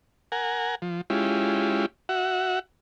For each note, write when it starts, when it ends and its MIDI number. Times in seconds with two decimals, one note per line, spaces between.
0.32 0.75 70
0.32 0.75 78
0.32 0.75 80
0.82 1.01 53
1.10 1.86 56
1.10 1.86 61
1.10 1.86 64
1.10 1.86 65
1.10 1.86 67
2.09 2.59 66
2.09 2.59 76
2.09 2.59 78